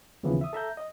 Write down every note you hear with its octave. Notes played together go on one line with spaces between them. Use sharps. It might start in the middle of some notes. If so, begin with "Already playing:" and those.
D#2 C#3 E3 F3 B3
E5 D#6
A4 E5 A#5 G6
D#5